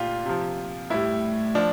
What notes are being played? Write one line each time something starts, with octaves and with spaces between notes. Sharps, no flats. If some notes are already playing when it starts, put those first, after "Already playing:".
Already playing: A#2 F4 G4
C3 F3
A2 G3 E4
F3 D4